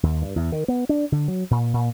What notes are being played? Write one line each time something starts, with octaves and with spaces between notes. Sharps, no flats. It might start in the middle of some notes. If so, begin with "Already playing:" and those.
D#2
G2
E2
D#3
B3
D4
D3
F#3
A#2
A#2